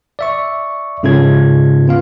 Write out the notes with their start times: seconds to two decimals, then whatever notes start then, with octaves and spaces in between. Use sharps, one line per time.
0.19 D5 E5 C#6
1.03 G#2 C#3 C#4 F4 A4 G#6
1.88 B3 F4 F5